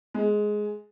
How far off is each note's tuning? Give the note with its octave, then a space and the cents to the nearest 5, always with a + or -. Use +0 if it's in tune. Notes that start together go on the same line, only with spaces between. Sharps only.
G#3 +10